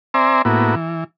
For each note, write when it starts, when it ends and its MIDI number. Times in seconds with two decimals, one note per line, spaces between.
0.14 0.42 60
0.14 0.42 72
0.14 0.42 74
0.14 0.42 76
0.14 0.42 80
0.14 0.42 82
0.45 0.75 45
0.45 0.75 58
0.45 0.75 59
0.45 0.75 64
0.45 0.75 66
0.75 1.04 52